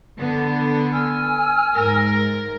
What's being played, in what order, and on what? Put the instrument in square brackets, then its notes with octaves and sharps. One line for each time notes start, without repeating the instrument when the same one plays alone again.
[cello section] D3 B3
[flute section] G#5 E6 F6
[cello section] G#2 A#4